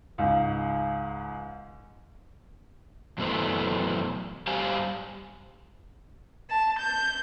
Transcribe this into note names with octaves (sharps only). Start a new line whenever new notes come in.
C#2 G#2
F#2 B2 E3 A3 C5
G2 G3 G4 C5 F5 G#5
A5
G6